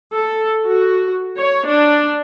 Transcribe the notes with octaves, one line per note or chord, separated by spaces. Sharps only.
A4
F#4
C#5
D4